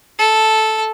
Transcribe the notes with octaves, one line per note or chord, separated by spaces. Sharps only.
A4